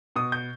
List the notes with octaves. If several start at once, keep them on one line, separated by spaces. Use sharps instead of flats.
B2 D#6
G6